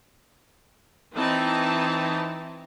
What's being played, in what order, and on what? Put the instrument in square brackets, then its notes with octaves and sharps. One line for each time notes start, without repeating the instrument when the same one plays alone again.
[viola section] E3 C4 D#4 A5